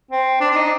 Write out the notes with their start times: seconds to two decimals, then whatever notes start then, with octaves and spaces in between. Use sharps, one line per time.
0.11 C4
0.41 D4
0.51 D4
0.56 D#4